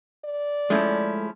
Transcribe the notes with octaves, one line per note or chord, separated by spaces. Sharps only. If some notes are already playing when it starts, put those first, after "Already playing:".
D5
F3 G#3 A3 C#4 E4